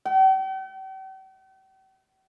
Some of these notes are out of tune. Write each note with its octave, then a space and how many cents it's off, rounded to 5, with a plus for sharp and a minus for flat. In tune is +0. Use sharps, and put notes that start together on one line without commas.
G5 -45